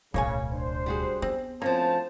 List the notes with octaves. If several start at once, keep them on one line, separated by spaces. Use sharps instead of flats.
D1 B1 C#3 A#3 C#5 G#5
D4 C5
G3 F#4 G#4
B3 C4
D2 F3 A#3 C4 C#4 C5 A5